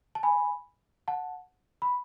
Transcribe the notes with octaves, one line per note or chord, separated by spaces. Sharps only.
A5
G#5 B5
F#5 A5
B5